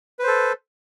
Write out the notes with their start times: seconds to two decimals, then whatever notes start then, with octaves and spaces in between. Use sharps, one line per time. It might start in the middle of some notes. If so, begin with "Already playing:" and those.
0.19 B4
0.23 C5
0.27 A4